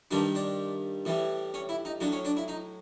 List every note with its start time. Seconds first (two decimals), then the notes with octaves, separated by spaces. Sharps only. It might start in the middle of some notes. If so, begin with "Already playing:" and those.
0.11 G2 D#3 G3 D4
0.35 D4
1.05 A2 E3 G3
1.54 C#4
1.69 E4
1.85 D#4
2.00 A2 F#3 D4
2.12 C#4
2.25 D4
2.37 E4
2.48 D#4